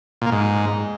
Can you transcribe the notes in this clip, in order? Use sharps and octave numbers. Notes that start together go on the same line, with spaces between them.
A#2
A#3
G#2